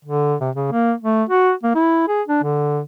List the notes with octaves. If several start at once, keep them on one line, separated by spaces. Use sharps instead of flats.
D3
C3
C#3
A#3
A3
F#4
A#3
E4
G#4
D4
D3